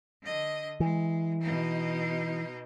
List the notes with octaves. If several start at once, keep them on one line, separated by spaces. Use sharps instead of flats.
D3 D#5
E3 G#3
B2 D#4